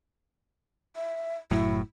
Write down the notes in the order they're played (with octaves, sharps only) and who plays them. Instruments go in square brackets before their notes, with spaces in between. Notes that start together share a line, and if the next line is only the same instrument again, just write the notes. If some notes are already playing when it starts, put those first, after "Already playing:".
[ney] E5
[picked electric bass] F#1 A2 F#3 [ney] E4